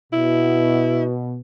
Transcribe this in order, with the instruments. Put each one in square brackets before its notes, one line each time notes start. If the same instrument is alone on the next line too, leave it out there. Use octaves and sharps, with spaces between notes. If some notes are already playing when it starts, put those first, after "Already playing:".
[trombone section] B2 [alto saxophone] E4